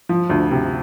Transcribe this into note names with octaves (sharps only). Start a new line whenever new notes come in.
F3
D2
C3